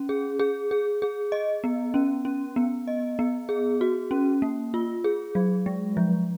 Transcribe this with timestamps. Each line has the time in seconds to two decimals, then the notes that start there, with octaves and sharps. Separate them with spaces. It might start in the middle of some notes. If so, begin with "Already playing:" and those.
Already playing: C#4
0.09 G#4
0.39 G#4
0.71 G#4
1.02 G#4
1.32 D#5
1.64 B3
1.94 C#4
2.25 C#4
2.56 B3
2.87 D#5
3.19 B3
3.49 G#4
3.81 F#4
4.11 C#4
4.42 A#3
4.74 F4
5.04 G#4
5.35 F#3
5.66 G#3
5.97 F3